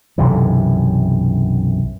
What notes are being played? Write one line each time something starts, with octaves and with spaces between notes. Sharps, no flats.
B1 F#2 C3 E3